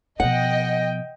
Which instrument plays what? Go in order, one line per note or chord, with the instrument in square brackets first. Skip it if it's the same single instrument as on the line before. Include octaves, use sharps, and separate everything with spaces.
[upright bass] B2 F3 [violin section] D#5 G5 [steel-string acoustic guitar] F#5